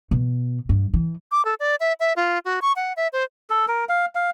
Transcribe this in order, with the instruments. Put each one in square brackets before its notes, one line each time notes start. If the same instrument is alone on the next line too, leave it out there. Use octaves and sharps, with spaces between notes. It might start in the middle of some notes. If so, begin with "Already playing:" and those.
[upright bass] B2
G2
E3
[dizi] D6
A4
D5
E5
E5
F4
F#4
C#6
F#5
E5
C5
[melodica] A4
A#4
F5
F5